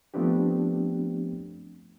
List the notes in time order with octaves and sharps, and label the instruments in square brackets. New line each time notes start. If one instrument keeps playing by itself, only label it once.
[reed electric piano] F3 A3 B3 C4 D4 G4